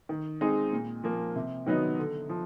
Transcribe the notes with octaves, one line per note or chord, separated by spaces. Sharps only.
D#3
G#3 C4 D#4 G#4
A#2
F3 A#3
C3
D#3 F#3 B3 D#4
D3
F3